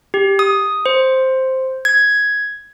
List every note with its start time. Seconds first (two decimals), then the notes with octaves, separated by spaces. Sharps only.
0.14 G4
0.39 D#6
0.86 C5
1.85 G#6